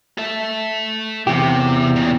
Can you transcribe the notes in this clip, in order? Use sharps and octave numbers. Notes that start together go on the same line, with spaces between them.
A4 E5
E2 C3 G4
A#2 C#3